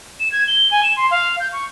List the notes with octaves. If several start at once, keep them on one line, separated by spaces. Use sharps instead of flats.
E7
G#6
G7
G#5
E7
C6
F5
G6
C#6